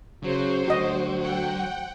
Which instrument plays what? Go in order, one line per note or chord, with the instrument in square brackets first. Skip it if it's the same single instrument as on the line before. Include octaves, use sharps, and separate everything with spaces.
[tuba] C#3 [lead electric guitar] F#3 [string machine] C5
[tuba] D2 [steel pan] F#4 D#5
[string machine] F#5 G5